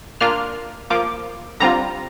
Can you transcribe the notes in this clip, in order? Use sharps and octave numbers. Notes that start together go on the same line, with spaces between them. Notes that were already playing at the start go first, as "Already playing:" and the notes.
A#2 A#3 D4 F4 F6
F3 A#3 F4 D6
D3 G3 C4 F4 A#5